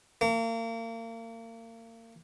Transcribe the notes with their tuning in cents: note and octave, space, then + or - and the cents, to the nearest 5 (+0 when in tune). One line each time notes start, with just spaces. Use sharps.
A#3 -35